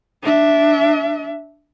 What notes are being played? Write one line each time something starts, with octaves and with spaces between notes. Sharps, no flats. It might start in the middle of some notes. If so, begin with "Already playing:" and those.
D4 E5